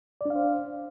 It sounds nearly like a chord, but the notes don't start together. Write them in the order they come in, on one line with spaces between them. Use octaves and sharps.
D5 D4 F5 C5